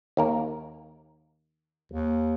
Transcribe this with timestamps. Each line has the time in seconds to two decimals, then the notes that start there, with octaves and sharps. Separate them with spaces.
0.17 D#2 A#3 A#4
1.92 D#2